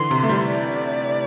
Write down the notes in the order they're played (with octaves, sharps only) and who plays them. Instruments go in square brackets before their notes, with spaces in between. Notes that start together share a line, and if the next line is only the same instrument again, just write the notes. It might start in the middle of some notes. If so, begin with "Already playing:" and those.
Already playing: [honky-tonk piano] D3 E3 [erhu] C6
[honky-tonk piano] C3
A3
G3
[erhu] D5